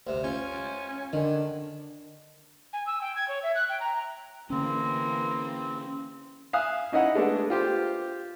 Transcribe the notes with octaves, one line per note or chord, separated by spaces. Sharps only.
D2 C3
C#4 F4
D3 D#3
G#5
E6
G5
G#6
C#5
E5
F#6
G5
A#5
D3 E3 A#3 C4 C#4
E5 F5 G#5 D#6 F#6
C#4 D#4 E4 D#5 F#5
G#3 A3 B3 D4
F4 G4 C5